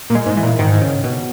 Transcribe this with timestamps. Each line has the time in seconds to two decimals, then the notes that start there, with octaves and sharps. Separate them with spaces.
0.10 A#2
0.15 G#3
0.26 G#2
0.37 E3
0.43 A#2
0.59 G#2 D#3
0.81 C#3
1.04 B2